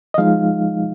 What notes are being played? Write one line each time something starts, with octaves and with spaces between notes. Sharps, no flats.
D#5
F3 G#3 D#4 F5